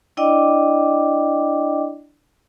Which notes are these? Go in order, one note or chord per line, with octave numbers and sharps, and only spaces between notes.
D4 E4 D5 D#5 G5 D6